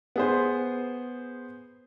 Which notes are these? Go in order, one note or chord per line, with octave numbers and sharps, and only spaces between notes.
B3 G#4 C5